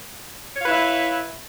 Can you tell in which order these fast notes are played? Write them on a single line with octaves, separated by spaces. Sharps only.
C#5 F5 B4 E4 E5